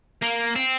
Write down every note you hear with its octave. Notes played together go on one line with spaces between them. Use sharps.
A#3
C4